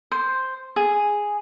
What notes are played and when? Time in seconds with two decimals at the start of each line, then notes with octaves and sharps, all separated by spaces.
0.11 C5
0.76 G#4